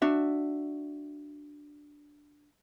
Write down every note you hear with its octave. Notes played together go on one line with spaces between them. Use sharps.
D4 F#4 E5